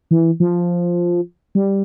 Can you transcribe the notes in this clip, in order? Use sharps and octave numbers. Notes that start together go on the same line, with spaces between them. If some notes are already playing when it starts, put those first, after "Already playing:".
E3
F3
G3